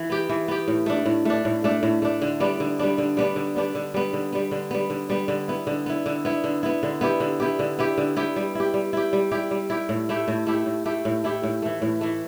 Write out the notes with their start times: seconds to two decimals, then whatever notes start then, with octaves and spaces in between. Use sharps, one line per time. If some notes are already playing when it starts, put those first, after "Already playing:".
Already playing: E3
0.10 B3 G4
0.29 E3
0.48 B3 G4
0.68 A2
0.86 A3 D4
1.06 A2
1.25 A3 D4
1.45 A2
1.64 A3 D4
1.83 A2
2.02 A3 D4
2.22 D3
2.40 G3 B3 D4
2.60 D3
2.79 G3 B3 D4
2.98 D3
3.17 G3 B3 D4
3.36 D3
3.56 G3 B3 D4
3.75 D3
3.94 G3 B3
4.13 D3
4.33 G3 B3
4.51 D3
4.71 G3 B3
4.90 D3
5.10 G3 B3
5.28 D3
5.48 B3 E4
5.67 D3
5.86 B3 E4
6.06 D3
6.25 B3 E4
6.44 D3
6.63 B3 E4
6.83 D3
7.01 B3 E4 G4
7.20 D3
7.40 B3 E4 G4
7.59 D3
7.79 B3 E4 G4
7.98 D3
8.17 B3 E4 G4
8.36 G3
8.55 E4 G4
8.74 G3
8.93 E4 G4
9.13 G3
9.32 E4 G4
9.51 G3
9.70 E4 G4
9.89 A2
10.09 A3 E4 G4
10.28 A2
10.47 A3 E4 G4
10.66 A2
10.86 A3 E4 G4
11.05 A2
11.24 A3 E4 G4
11.44 A2
11.62 E3 A3
11.82 A2
12.01 E3 A3